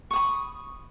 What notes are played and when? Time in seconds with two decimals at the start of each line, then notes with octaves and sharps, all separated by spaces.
0.11 C#6
0.13 D#6
0.16 B5